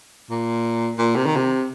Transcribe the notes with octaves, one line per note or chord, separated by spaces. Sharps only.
A#2
A#2
C3
D#3
C3